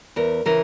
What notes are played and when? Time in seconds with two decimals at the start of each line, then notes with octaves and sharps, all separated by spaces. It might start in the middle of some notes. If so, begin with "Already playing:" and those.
0.16 E2 A#4
0.46 C#3 E3 A#4